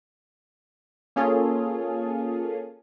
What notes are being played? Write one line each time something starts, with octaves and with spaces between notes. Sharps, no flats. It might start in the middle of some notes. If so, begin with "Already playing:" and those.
A#3 C#4 F4 G#4 A4